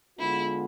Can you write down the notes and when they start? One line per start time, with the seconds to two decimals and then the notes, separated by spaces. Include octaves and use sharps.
0.19 D3 G#3 B3 E4 F4 G#4